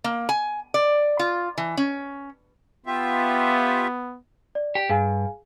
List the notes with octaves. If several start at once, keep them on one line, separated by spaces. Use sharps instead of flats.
A#3
G#5
D5
F4
E3
C#4
B3 F4 G4 E5
D5
G4
G2 G#4 F5 G#5